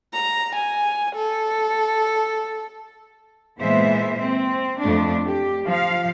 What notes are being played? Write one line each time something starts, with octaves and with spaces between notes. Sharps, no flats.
A#5
G#5
A4
A#2 E3 G#3 B3 C5 E5
C4
F2 A3 D4
G4
F3 F5